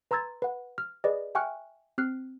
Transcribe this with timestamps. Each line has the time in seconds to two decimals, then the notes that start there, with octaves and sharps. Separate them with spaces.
0.11 B4 A#5 C6 E6 G#6 A6
0.42 B4 F#5
0.78 F6
1.04 G#4 B4 D5 D#5
1.35 E5 G5 G#5 C#6 F6 F#6
1.98 C4 F6 F#6 C7